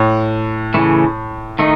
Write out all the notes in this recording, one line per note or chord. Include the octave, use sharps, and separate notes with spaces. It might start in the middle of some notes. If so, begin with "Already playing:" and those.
Already playing: A2
C#3 E3 A3
D#3 A3 D#4